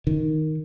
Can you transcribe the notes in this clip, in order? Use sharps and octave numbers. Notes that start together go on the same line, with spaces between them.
D#3